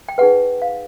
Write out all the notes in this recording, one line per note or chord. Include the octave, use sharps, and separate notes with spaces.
G5
D#4 G#4 B4 F#5
F5